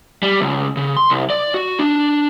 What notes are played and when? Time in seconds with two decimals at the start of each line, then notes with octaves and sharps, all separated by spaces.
0.23 G3
0.41 C#2
0.77 C#3
0.97 C6
1.10 C2
1.30 D5
1.54 F#4
1.79 D4